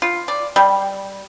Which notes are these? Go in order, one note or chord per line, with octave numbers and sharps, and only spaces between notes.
F4
D5
G3